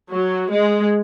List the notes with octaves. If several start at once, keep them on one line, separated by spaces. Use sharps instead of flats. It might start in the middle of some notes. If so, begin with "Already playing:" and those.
F#3
G#3